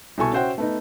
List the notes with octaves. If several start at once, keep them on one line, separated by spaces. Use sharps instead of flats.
C2 B2 A4 G#5 C#6
C#4 F#4 C5 E5 F#5 G5
A3 B3 D#4